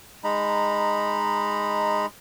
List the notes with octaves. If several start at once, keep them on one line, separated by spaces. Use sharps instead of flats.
G#3 D#4 A#5 B5